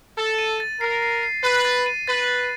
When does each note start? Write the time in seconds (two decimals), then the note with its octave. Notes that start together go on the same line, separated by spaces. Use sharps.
0.18 A4 A6
0.38 D#7
0.60 A6
0.81 A#4 C7
1.02 C7
1.23 C7
1.44 B4 C7
1.65 A6
1.86 D#7
2.08 B4 A6
2.28 A6